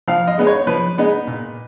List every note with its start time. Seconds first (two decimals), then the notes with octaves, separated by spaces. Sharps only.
0.08 F3 F5
0.28 D#5
0.38 G#3 B3 D#4
0.47 C#5
0.67 F3 B4
0.98 G#3 B3 D#4
1.27 A#2